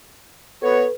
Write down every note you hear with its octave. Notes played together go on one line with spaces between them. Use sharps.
B3 F#4 A4 B4 C#5